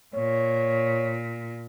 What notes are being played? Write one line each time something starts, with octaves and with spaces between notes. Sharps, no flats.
A#2 C#5